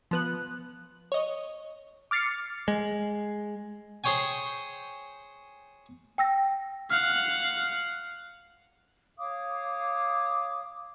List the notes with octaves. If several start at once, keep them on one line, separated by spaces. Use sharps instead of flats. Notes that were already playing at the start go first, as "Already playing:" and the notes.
F3 B3 F#6
C#5 D#5
D6 F6 A6 C7 C#7
G#3
G#4 C5 C#5 G5 G#5
G5 E6 A#6
F5 F#5 F6
C#5 F5 D6 D#6